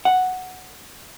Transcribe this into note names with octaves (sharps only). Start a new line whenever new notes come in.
F#5